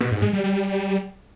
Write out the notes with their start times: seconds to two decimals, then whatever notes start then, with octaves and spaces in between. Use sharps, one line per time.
0.01 B2
0.11 G#2
0.22 G#3
0.33 G3
0.44 G3